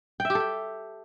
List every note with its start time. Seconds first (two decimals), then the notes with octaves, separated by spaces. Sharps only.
0.20 G5
0.25 E5
0.30 G4
0.35 A4
0.40 G5